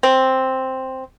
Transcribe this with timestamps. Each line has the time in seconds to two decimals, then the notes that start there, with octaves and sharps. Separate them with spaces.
0.03 C4